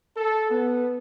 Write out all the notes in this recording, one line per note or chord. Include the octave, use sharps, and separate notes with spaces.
A4
B3